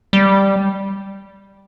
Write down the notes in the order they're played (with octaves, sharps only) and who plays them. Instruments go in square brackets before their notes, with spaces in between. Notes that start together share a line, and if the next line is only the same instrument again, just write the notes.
[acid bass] G3